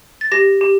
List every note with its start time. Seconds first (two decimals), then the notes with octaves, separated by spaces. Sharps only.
0.21 A6
0.32 G4 A#6
0.61 G4